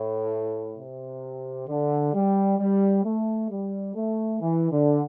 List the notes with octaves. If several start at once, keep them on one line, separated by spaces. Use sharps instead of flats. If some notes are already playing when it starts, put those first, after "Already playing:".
Already playing: A2
C3
D3
G3
G3
A3
G3
A3
E3
D3